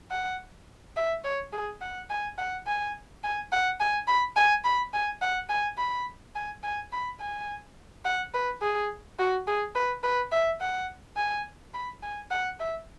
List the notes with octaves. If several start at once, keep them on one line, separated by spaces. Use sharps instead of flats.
F#5
E5
C#5
G#4
F#5
G#5
F#5
G#5
G#5
F#5
G#5
B5
G#5
B5
G#5
F#5
G#5
B5
G#5
G#5
B5
G#5
F#5
B4
G#4
F#4
G#4
B4
B4
E5
F#5
G#5
B5
G#5
F#5
E5